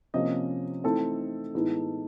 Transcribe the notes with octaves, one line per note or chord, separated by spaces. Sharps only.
C3 F3 A#3 C#4 D#5
E3 A3 C4 D#4 A4
A2 E3 G#3 B3 D#4